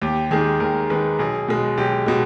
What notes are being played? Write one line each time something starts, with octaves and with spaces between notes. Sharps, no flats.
D#2 G4
D#3 G#3 G#4
D#2 A#4
D#3 G#3 B4
B1 G#4
B2 G#3
B1 G4
B2 G#3